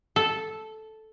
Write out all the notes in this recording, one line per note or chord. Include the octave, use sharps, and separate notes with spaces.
A4